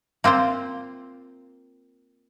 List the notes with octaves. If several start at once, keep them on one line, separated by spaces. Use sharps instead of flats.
A#3 C4 F4 C5